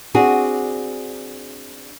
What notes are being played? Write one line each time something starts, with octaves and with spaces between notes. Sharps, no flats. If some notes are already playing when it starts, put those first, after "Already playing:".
C4 D4 F#4 G#4